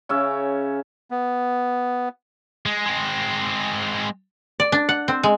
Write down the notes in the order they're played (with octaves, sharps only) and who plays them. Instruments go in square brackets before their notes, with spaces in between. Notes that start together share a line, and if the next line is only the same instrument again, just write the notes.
[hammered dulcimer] C#3 C#4 E5
[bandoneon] B3
[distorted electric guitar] G#3
G#3 C4
[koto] D5
D4
F#5
C4
G#3